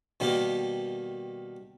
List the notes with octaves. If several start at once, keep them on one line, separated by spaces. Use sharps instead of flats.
B2 D#3 G3 A#3 G4